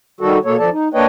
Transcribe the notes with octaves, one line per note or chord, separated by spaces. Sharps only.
D#3 G3 F#4 A4
B2 A#3 A4 C#5
F2 F3 A4 D5 A5
D#4
A#3 D4 B4 C#5 D#5 G5